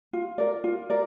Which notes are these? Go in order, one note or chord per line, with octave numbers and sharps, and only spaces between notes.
F4
A#4 D5
F4
A#4 D5